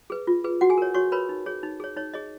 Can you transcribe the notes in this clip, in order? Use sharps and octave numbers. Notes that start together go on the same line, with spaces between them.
G#4 B4
F4
G#4 B4
F#4 F#5
G#4 G#5
A#4 C#5
F#4 C#5 C#6
A#4 B4 C#5 B5
D#4
G#4 C#5
D#4
G#4 C#5
D#4 C#5
G#4 C#5 D#5